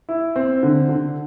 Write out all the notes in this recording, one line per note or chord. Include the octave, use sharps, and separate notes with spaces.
E4
C4
D3
D3